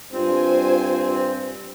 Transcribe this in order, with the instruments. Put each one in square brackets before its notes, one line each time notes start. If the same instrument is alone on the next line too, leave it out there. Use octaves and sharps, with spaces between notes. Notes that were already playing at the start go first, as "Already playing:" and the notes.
[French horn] G2 [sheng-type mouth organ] C4 [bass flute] F4 [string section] C5 G#5